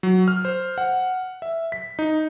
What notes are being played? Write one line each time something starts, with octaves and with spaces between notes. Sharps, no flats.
F#3
F6
C5
F#5
E5
B6
D#4